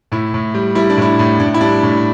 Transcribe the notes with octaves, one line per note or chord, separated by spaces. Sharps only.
A2 E4
A2
G3
G3 E4
D4
A2 E4
A2
A2 D4
E4
G3 D4
A2